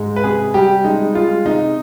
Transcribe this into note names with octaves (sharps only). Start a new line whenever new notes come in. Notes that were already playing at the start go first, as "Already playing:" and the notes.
Already playing: G#2 G#3
B4
C3 G#4
G3 G4
G#3 D#4
G#3 F4
C3 D#4